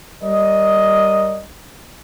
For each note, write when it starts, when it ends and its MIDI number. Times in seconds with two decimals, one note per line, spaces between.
0.22 1.43 55
0.22 1.43 70
0.22 1.43 74
0.22 1.43 75